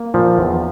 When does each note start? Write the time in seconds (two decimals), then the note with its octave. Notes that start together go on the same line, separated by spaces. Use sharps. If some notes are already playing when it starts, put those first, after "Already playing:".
Already playing: A#3
0.14 A#2 F3
0.38 E2